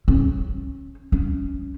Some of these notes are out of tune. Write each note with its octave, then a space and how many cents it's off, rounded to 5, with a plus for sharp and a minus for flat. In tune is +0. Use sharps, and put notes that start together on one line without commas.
C#4 -25
C#4 +10